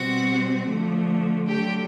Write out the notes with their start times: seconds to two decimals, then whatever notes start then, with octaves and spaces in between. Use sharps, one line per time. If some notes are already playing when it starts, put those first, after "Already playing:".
Already playing: B2 G3 C4 F#4 F#5
0.67 D3 F3 A3
1.47 D3 F#3 A3 G4 G5